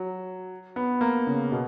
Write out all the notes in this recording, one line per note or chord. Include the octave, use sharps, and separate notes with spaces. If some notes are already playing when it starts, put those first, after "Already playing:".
Already playing: F#3
B3
A#3
C#3
B2